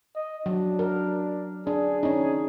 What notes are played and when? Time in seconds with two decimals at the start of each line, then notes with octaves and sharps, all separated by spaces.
0.15 D#5
0.46 F#3 D4
0.79 A#4
1.67 D4 G#4
2.03 C#4 D#4